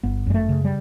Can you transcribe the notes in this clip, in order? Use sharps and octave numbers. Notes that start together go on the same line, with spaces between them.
G1 B3
F#2 G3
A3
C#3
G3